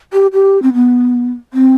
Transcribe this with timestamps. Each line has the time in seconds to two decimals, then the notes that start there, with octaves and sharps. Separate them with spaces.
0.13 G4
0.33 G4
0.63 C4
0.74 B3
1.54 C4